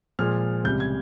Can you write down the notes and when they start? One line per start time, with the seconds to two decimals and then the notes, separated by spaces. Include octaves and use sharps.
0.19 A#2 F3 G#3 F6
0.64 C#2 C3 G3 G6
0.80 G#6